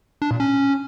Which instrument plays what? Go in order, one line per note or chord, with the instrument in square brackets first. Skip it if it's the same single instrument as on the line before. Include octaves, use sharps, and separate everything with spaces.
[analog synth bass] D4
A#2
C#4